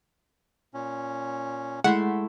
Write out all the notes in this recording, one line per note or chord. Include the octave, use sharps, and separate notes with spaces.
A#2 C#4
G#3 A3 E4 F#5 C6